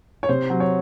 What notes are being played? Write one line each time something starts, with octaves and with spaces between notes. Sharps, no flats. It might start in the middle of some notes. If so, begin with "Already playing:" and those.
C#5
C3 C5
F#3
C#5